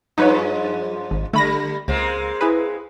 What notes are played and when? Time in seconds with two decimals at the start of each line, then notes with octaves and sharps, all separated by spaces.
0.18 F#2 F3 G#3 D#4 B4 C#5
1.11 G#1
1.33 D3 G3 A3 B5 A#6
1.88 C#2 G#3 A#3 C4
2.41 E4 G#4 B4